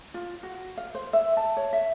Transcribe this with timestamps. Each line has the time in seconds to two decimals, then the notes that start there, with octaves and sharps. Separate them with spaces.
0.14 F4
0.43 F#4
0.77 F5
0.95 C5
1.13 E5
1.37 A5
1.57 C#5
1.73 E5